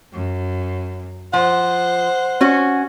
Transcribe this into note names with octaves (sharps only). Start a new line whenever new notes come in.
F#2
F3 C5 F#5
C#4 F#4